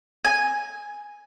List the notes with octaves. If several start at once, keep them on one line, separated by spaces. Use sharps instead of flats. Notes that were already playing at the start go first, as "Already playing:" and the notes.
G#5